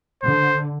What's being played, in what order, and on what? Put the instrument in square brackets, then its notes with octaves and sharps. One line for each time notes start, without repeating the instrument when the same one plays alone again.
[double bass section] D3 [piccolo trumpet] C5